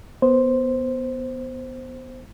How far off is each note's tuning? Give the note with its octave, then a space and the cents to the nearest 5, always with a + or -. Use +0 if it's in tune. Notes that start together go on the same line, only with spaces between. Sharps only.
B3 +0 C5 +0